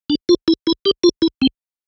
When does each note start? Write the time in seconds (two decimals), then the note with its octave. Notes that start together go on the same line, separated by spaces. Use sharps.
0.10 D4
0.29 F4
0.48 E4
0.67 E4
0.85 G4
1.04 F4
1.22 E4
1.42 C4